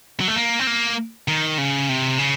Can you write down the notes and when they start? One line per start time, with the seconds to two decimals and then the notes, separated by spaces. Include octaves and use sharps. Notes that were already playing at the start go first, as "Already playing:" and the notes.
0.20 F#3
0.28 A3
0.36 A#3
0.59 C4
0.67 A#3
1.28 D#3
1.58 C#3
1.89 C3
2.19 C#3